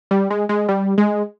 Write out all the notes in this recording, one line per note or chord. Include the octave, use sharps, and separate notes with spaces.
G3
G#3
G#3
G3
G#3